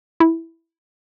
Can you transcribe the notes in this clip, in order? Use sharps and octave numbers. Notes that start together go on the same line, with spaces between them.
E4